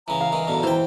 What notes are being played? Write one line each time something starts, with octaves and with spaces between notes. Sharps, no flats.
C#3 E3 A#5
F5
D#3 E3
E2 B2 D3
E3 C5 G5